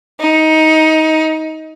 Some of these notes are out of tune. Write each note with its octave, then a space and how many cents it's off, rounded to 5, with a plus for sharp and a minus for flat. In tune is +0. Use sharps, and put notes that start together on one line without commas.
D#4 +20